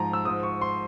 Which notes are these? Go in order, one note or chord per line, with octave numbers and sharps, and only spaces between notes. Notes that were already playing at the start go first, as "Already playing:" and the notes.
Already playing: G#2 F3 A#5
E6
G#2 F3 D#6
C#6
C6